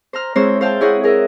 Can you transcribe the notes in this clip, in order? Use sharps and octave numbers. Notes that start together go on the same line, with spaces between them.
C5 A#5 F6
G#3 C4 E4 C5 C#5
C5 F5 G5 A5
E4 G#4 C#5 D#5 F#5
G#4 A#4 D#5 E5